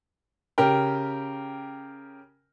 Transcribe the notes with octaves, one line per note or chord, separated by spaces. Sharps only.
C#3 G4 A#4 G5